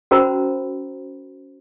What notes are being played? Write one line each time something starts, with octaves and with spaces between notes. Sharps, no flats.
C#4 F#4 A#4 C5 A#5 B5